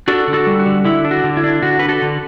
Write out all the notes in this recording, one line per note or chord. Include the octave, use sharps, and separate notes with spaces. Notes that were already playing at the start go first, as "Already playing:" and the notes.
D4 F#4 A4
D3
F#4 A4
G3
F#4
D3
D3 E4
D4
F#4
D3
E4
D4
D3 F#4
D4 B4
F#4 A4
D3